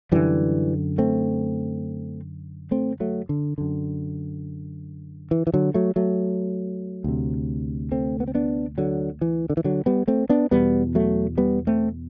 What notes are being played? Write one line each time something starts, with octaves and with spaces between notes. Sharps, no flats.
F#2 D3 E3 G3
A3 C4
A3 C4
F#3 A3
D3
F#2 D3
E3
E3
D3 F#3
F#3 A3
F#3 A3
D2 C3
A3 C4
B3
C4
B3 D4
D3 F#3
E3
D3
E3
D3 F#3
G3 B3
A3 C4
B3 D4
E2 B2 G3 B3
F#3 A3
G3 B3
A3 C4